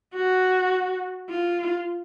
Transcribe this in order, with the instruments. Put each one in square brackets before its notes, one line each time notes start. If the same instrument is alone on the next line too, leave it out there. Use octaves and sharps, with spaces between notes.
[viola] F#4
F4